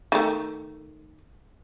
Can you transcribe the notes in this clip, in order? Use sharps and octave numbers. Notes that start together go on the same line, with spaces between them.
D#3 A3